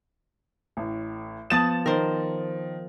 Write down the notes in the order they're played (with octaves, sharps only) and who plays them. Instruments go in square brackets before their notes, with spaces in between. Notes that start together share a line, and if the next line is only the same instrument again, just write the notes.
[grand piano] A1 A2
[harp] F3 B3 A5 [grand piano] D#6 A6 E7
[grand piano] D#3 [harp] A#4 C5